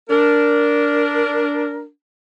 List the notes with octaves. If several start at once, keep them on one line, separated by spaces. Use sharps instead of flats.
D4 A#4